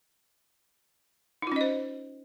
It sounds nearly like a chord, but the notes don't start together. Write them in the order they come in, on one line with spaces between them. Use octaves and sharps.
D#4 F4 C#4 D#5 C5